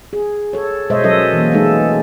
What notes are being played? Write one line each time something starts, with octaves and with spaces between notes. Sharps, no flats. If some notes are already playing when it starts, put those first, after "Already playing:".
G#4
A4 C#5
B2 G#3 C5 C#5 D#5 E5
F#3 C#4 A4 A#4 D#5 E5
E3 A#3
G#3 A3 B3 D4 D#4 A4